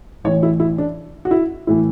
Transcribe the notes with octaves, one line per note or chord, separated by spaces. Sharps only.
A1 A2 E3 C#5
E4
E4
D4
F#4
E4
A2 E3 E4